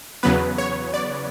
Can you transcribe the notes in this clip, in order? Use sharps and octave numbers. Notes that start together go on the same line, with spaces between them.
E2 C#3 F#3 B3 B4
C#5
D5